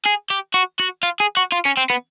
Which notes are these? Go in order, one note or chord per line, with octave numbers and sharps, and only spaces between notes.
G#4
G4
F#4
F#4
F4
G#4
F#4
F4
C#4
C4
B3